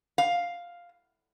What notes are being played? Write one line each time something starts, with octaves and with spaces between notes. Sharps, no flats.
F5